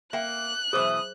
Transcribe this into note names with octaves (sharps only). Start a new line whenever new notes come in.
A#3 E5 G5 F#6
B2 E3 G#4 C5 E5 D6 D#6